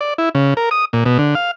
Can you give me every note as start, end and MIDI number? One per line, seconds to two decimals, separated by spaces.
0.01 0.14 74
0.18 0.29 64
0.35 0.54 49
0.57 0.69 70
0.71 0.85 87
0.93 1.04 46
1.05 1.18 47
1.19 1.35 50
1.35 1.51 77